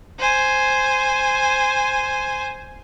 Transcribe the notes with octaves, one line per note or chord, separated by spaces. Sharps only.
C5 G#5